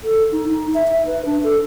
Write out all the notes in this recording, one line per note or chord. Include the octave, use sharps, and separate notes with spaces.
A4
D#4
D#4
E5
E5
B4
D4
A4